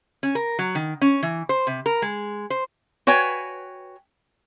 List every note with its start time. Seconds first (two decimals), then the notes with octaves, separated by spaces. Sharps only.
0.23 C#4
0.35 A#4
0.59 F#3
0.75 D#3
1.01 C#4
1.23 E3
1.49 C5
1.67 C3
1.86 A#4
2.02 G#3
2.50 C5
3.07 F#4 B4 C#5 G5 G#5